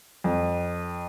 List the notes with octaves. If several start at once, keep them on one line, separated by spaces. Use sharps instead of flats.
F2